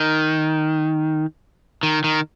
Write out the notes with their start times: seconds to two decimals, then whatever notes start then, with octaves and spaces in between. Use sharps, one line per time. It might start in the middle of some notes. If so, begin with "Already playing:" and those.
Already playing: D#3
1.83 D#3
2.04 D#3